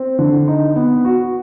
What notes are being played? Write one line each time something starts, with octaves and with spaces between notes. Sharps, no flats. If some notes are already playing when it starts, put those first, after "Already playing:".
Already playing: C4
D3
D#4
B3
F#4